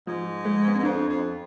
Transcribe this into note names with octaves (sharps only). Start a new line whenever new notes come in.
G#2 F3
G#3
B3
G#2 C4
F2 D4
F2